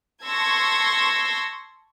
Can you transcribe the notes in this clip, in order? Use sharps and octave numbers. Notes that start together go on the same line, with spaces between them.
A5 C6 C#6 E6 G#6 A#6